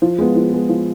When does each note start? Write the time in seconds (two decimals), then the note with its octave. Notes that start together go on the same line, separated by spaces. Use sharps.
0.02 F3
0.18 G#3 B3
0.36 F3
0.53 G#3 B3
0.69 F3